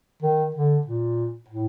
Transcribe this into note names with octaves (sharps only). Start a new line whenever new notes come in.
D#3
D3
A#2
A2